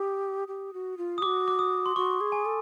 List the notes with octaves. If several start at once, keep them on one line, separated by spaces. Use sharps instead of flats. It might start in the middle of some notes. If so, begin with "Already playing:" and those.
Already playing: G4 D#6
G4
F#4
F4
D#6
F#4 G4 D6
D6
D#6
C6
F#4 C#6
G#4
G#5
A4